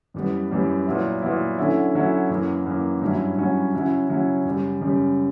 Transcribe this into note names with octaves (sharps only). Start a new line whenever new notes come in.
F#2 E3 G3 B3
F#2 E3 G3 B3
A#2 F#3 B3 E4
A#2 F#3 B3 E4
D3 F#3 C#4 E4
D3 F#3 C#4 E4
F#2 E3 A#3
F#2 E3 A#3
G2 F#3 C#4 E4
G2 F#3 C#4 E4
C#3 F#3 C#4 E4
C#3 F#3 C#4 E4
F#2 C#3 G3
F#2 C#3 G3